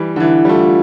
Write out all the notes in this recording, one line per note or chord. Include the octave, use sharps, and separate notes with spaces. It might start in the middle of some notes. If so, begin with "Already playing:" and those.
Already playing: E3 G3
D3
E3 E4
G3
A3 F4